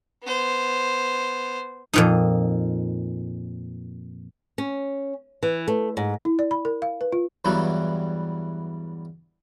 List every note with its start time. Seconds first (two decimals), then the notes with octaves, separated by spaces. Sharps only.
0.24 B3 C5
1.93 F2 A#2 D#4
4.58 C#4
5.43 E3
5.68 A3
5.97 G#2
6.25 E4
6.39 D5
6.51 B5
6.65 A#4
6.82 F5
7.01 B4
7.12 F4
7.45 E2 G2 E3 F#3 G3